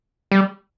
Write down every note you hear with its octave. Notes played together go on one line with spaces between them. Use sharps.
G3